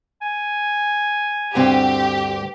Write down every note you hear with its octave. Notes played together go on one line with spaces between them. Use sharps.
G#5
D2 G2 C4 G4